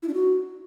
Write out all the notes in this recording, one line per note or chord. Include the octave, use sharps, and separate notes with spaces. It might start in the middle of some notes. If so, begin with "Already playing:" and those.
E4
D4
F#4